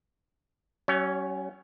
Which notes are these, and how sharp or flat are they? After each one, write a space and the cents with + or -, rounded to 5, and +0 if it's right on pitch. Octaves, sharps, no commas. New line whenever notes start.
F#3 +40 C#4 +0